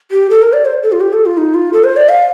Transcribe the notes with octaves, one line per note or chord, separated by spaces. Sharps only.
G4
A4
A#4
D5
C5
A4
F4
G4
A4
F4
D#4
F4
A4
C5
D5
F5